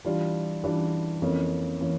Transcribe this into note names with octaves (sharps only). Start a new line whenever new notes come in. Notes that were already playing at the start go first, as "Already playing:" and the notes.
E3 G3 D4 F4
E3 G3 D4 F4
F2 E3 A#3 C#4
E3 A#3 C#4